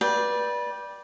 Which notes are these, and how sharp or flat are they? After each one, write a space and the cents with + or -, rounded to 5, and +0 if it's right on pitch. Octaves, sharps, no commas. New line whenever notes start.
B4 -25 D5 +0 G5 +0